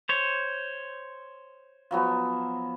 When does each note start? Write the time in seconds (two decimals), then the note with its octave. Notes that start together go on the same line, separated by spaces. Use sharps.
0.09 C5 C#5
1.91 F3 F#3 B3